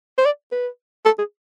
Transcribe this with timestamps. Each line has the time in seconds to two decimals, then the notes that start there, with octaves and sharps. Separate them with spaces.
0.18 C5
0.26 D5
0.52 B4
1.06 A4
1.19 G#4